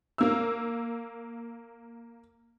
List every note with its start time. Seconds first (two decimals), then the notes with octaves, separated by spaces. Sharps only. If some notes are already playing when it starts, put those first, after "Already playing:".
0.18 A#3 E6